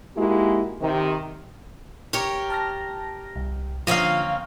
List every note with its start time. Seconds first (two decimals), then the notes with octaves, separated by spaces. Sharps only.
0.17 G#3 A#3 D#4 E4 F#4 G4
0.82 C3 D#3
2.13 G4 A#4 C#5
2.50 A5 F6 A#6
3.36 C2
3.87 D3 F3 A#3 C4 C#4 D#5 F5